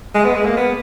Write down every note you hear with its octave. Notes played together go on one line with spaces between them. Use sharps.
G#3
B3
G#3
A#3
B3